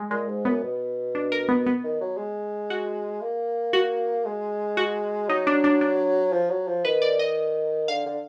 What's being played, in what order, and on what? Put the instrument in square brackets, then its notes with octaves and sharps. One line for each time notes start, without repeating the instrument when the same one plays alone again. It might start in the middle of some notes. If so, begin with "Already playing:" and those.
Already playing: [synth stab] G#3
[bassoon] A#2 [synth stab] G#3
[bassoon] G#2
[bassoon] F#2 [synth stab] B3
[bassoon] B2
[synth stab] D4
A#4
B3
B3
[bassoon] D#3
F#3
G#3
[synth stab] F#4
[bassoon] A#3
[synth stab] F#4
[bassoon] G#3
[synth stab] F#4
[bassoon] F#3 [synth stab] D#4
[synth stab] D4
D4
D4
[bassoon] F3
F#3
F3
[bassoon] D#3 [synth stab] B4
[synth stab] D5
D#5
[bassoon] D3 [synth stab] F5
[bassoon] D3